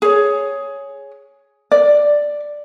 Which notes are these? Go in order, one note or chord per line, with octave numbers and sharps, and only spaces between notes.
G#4 C#5
D5